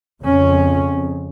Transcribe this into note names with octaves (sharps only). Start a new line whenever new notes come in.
F2 C#3 C#4